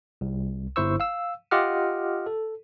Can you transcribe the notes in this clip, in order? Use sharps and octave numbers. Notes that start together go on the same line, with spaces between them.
C2
G1 E4 C5 C#6 E6
F5 E6
F4 G4 D#5 F#5 D6 F6
A4